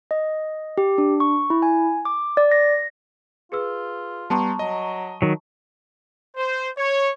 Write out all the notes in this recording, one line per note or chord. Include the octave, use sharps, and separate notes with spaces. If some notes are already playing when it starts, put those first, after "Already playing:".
D#5
G4
D4
C#6
E4
G#5
D6
D5
A#6
F4 G#4 B4 E6
G3 B3 A5 A#5 C6 C#6
F#3 D#5
D#3 F#3
C5
C#5